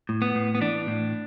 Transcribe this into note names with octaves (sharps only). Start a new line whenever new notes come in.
A2
B3
A2
B3
E3 D4
A2